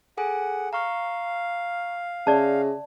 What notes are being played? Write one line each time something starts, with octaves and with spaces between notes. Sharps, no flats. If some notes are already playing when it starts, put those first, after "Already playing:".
G#4 A4 F#5 G#5
F5 A#5 C#6 F6
C#3 C#4 D5 E5 A5